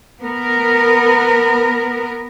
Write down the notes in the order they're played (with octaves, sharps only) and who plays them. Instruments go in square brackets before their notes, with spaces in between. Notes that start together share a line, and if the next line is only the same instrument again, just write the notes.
[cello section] B3 A#4